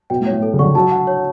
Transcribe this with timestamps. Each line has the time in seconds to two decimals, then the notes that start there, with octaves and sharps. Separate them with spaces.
0.10 B2 G5
0.21 A2
0.26 C#5
0.32 A2
0.42 A4
0.53 C#3
0.59 D3 C#6
0.64 C#3
0.75 F#3 A5
0.92 F#5
1.07 C#5